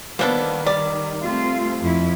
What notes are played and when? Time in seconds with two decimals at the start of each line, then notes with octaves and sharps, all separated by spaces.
0.19 D#3 F3 G3 A#3 B3 D4 A4
0.66 G3 D5
1.22 A3 C4 F4
1.80 F2 E4